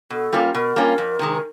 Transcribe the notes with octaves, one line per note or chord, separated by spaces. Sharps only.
B2 A4
G3 A#3 C#4 F4
B2 A#4
G3 A#3 C#4 F4
F2
C3 D#3 G#3